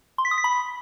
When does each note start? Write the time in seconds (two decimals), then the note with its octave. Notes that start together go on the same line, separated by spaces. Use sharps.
0.18 C6
0.25 B6
0.31 D#6
0.38 B6
0.44 B5